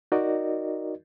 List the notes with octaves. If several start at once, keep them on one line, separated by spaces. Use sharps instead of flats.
D#4 F#4 A#4 D5 D#5